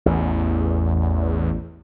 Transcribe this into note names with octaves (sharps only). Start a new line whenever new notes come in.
A1 E2